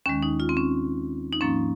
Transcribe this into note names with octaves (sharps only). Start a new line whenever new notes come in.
D#2 D#3 G#3 C#4
D#4
F4
C4
C#4
D#4
G#2 F3 A#3 C#4